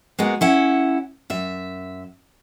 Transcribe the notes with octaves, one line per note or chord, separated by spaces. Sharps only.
G#3 A#3 B3 F#4
C#4 E4 F#5
F#2 E5